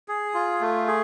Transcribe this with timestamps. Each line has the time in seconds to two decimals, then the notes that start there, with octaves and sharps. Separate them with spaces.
0.08 G#4
0.34 F4
0.61 A3
0.87 G#4